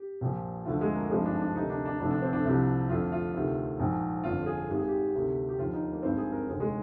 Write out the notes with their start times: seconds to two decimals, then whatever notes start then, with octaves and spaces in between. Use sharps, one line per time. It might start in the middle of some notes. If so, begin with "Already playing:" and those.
Already playing: G4
0.21 A#1 A#2 F3
0.65 D2 D3 F3 F4
0.81 G#3
0.95 A#3
1.10 G#1 G2 D3 F3 G#3
1.26 D4
1.40 D4
1.55 D2 C3 D#3 D#4
1.70 D4
1.85 D4
1.99 F1 F2 D3 D4
2.11 D4
2.22 C4
2.33 D4
2.45 C2 C3 F3
2.89 F1 F2 D3 F4
3.12 F4
3.34 D2 C3 D#3
3.79 A#1 G#2 F3
4.24 G1 F2 D3 F4
4.46 G#4
4.68 G#1 G#2 D#3 G4
4.77 G#4
4.88 G4
5.14 D2 C3 D#3
5.49 G4
5.58 D#2 D3 F3 F4
5.73 D#4
5.93 A#3
6.03 G#1 G2 D#3 C4
6.17 G#4
6.32 A#4
6.48 F1 D#2 D3 G#4
6.60 G#3